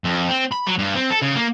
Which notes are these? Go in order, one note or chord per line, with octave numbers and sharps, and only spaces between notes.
F2
C4
B5
F#3
G2
C4
A4
C#3
A#3